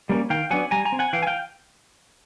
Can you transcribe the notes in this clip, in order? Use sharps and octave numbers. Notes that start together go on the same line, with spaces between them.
G3 A#3 C#4
D#3 F5 G5
F#3 B3 D4 F#5 G#5
G3 G#5 A#5
G#5 A#5
C4
F#5 G#5
E3 F5 G5
G#5
F5 G5